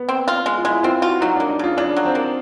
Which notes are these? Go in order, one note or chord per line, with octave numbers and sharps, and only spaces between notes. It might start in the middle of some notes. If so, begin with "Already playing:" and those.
Already playing: B3
C4
F4
G#3
F4
G#3 E4
C4 F4
F4 F#4
F#3 D#4
A#3 D4
D#4
C#3 F4
C#3 D4
F#3
C4
A#3